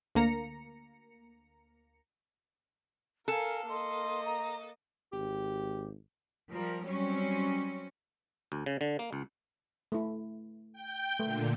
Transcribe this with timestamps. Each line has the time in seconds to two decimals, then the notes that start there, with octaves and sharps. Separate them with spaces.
0.15 D2 A#3 A#5 C#7
3.28 A4 A#4 F5 G#5
3.69 A#3 D#5 C6
4.26 A#5
5.12 G#1 G4
6.51 F3 G3 A#4
6.84 F#3 G3 C4 C#4
8.52 D2
8.66 C#3
8.81 D3
8.99 A#3
9.13 C#2
9.92 A3 E4
10.73 G5 G6
11.19 A#2 D3 A3